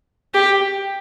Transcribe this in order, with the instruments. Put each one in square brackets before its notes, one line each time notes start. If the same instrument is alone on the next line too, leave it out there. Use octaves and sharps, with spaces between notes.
[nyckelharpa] G4